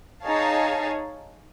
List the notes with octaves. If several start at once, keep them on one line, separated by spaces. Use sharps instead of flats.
D#4 G#4 C#5 F5 A5